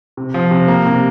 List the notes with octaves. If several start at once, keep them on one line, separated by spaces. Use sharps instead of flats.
C3
F3
C3
A#3
C3